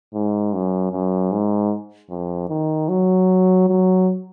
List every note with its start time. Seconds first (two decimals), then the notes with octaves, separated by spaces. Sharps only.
0.14 G#2
0.54 F#2
0.92 F#2
1.32 G#2
2.10 F2
2.49 D#3
2.89 F#3
3.68 F#3